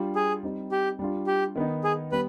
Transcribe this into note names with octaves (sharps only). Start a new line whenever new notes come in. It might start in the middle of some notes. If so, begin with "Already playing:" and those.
Already playing: G3 D4 F4
G#4
G3 C4 D#4
G4
G3 D4 F4
G4
D#3 B3 D#4
G#4
G3 B3 B4